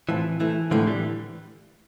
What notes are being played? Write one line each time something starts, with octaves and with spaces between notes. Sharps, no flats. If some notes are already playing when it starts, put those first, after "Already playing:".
A2 E3 F3 C4 F4
E3 F3 A3 E4
A2 D3 E3 F3 A3 C4 E4
E3 G3